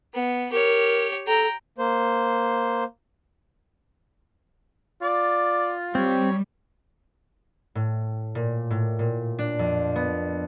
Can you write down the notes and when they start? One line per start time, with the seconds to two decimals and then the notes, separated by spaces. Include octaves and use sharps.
0.14 B3
0.52 G4 A#4 C#5
1.27 A4 G5 A#5
1.78 A#3 C5
5.02 F4 D5
5.95 G3 C4 C#5
7.75 A2
8.35 A#2
8.70 A2
8.99 A#2
9.39 D4
9.59 F2
9.96 B3